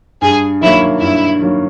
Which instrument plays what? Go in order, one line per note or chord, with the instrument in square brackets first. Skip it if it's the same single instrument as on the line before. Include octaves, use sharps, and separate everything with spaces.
[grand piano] G2 [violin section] G#4
[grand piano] D#3 F#3 A#3 [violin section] E4
[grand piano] G2 [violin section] E4
[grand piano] D#3 F#3 A#3